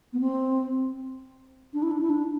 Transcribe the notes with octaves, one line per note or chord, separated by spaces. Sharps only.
B3
C4
D4
E4
D4
E4
D4